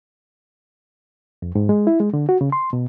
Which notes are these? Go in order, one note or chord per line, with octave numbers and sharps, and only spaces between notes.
F2
G#2
G#3
E4
G#3
D3
F#4
C#3
C6
B2